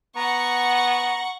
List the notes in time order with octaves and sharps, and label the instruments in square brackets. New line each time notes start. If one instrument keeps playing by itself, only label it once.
[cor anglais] B3 [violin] F#5 C#6 [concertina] A#5